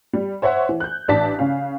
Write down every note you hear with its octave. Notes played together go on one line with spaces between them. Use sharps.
G3
C5 C#5 E5 F#5
E3
F#6 G6
A1 D4 D5 A5 B6
C#3 C#4 F5